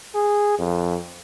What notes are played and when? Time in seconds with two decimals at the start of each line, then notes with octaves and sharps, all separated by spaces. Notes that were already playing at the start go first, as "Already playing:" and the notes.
0.15 G#4
0.58 F2